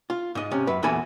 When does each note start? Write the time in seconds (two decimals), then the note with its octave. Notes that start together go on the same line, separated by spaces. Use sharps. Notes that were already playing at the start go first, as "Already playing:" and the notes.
0.10 F4
0.35 G#2 D#5
0.51 C3 C#4
0.67 F#2 B4
0.83 E2 A#2 F#4 A4 G#5 B5